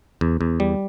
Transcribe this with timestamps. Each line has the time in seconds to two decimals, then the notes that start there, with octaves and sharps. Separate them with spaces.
0.21 E2
0.41 E2
0.60 G3